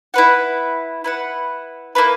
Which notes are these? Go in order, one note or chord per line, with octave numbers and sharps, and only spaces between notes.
E4 B4 F#5
E4 B4 F#5
A#3 E4 B4